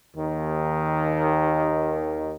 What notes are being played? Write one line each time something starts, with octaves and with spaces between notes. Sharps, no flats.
D#2 D#3